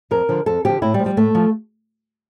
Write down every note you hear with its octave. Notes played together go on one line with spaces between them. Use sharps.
F2 A#4
D3 F3
F2 A4
D3 F3 G4
A2 E4
G3
F3
G3
A2 A3
F3